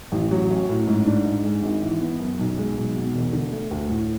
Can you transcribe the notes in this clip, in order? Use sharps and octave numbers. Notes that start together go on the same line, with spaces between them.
A1
F#3
C#4
A2
G#2
D4
G#2
G#3
G#1
E3
B3
F#2
B1
G#3
B1
B2
E1
D3
A3
D2
A2